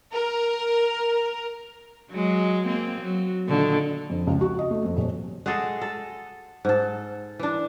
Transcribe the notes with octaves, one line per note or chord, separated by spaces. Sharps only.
A#4
F#3 G#3
A#3 C4
F#3
A#2 D3 D#3
F2
C#2
F#4
D#5
A3
F2
D#1
G#3 F#4 G#4 A4
A4
G#2 A4
E3 D4